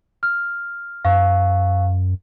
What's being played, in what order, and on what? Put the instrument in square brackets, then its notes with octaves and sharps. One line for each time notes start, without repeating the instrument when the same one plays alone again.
[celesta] F6
[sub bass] F#2 [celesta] F5 C#6